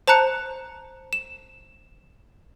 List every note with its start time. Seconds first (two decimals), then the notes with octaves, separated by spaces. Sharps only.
0.07 C5 A5 A#5 F#6 C#7
1.13 E7